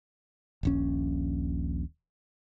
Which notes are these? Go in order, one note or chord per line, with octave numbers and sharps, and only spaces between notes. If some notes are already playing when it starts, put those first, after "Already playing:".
D#1 A#1 C#4